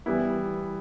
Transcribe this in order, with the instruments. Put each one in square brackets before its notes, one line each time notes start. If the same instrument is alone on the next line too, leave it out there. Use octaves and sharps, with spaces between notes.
[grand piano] E3 G3 B3 E4